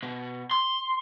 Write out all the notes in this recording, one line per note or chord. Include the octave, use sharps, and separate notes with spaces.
B2
C6